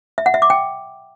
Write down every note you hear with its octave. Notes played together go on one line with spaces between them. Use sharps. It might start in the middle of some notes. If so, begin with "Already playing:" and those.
E5
F#5
E5
D6
G5